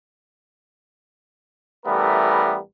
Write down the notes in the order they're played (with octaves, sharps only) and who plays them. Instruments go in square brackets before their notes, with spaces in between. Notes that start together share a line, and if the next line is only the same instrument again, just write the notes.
[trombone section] A1 E3 G3 A3 B3 A#4